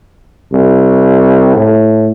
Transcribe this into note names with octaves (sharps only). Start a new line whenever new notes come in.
C2
A2